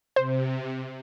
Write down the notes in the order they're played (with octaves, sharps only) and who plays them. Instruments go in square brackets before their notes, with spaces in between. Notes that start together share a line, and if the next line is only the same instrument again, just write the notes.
[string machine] C3 [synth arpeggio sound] C5